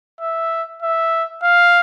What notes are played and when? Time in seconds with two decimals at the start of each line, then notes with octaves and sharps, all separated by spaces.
0.20 E5
0.82 E5
1.43 F5